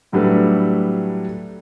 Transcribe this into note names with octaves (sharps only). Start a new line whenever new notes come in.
A2 F#3 G3 A3 D4 B4